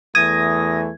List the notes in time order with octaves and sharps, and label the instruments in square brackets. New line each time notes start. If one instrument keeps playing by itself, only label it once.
[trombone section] E2 E3 A3 [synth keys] D#6 A#6 [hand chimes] G#6